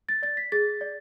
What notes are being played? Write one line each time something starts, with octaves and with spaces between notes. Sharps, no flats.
A6
D5 A6
B6
G#4 A6
D5